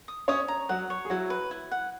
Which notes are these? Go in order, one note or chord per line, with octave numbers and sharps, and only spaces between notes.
D#6
C#4 C#5 D#6
A#5
F#3 F#4 F#5
C#5
G#4
F#3 E4 F#4
B4
E4
F#5